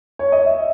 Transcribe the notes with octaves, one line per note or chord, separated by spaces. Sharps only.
C#5
D#5
E5